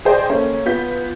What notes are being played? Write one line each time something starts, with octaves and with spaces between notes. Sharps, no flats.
G#4 C5 D5 D#5 G5 G#5
A#3 C#4 A4
B3 F4 G6 B6